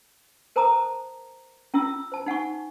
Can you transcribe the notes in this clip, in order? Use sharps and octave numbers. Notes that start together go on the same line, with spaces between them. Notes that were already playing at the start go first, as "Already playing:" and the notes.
A#4 C5 A5 A#5 D#6
C#4 E4 F4 E6
C5 A5
D#4 F#5 G#5 C#6